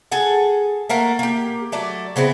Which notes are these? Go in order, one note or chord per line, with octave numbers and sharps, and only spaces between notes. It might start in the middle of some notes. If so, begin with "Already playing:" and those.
G#4 A4 F#5
A3 A#3 A#4 F#5
A#3 G4
F#3 A3 D5
C#3 B3 C4 E4